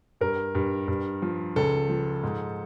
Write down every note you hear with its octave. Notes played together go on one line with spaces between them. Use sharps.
G2 A#4
G2
G2
F3
C#2 A4
F3
G#2